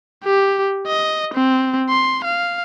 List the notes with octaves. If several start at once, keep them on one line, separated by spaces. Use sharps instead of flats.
G4
D#5
C4
C6
F5